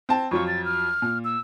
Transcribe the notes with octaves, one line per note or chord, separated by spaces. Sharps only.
C4 A5
F2 F#3 F4 C#6
A6
F6
A#2
E6